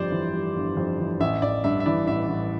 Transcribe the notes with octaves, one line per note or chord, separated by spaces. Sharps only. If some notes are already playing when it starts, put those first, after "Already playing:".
Already playing: G1 F2 G3 C5 D5
E3
G3
G1
F2
E3
A1 E5
A1 D5
G2 E5
E5
E3 D5
A1 E5
A1